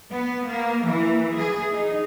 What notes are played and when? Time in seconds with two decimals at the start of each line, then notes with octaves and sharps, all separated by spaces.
0.12 B3
0.47 A#3
0.89 E3
1.37 G#4
1.72 D#4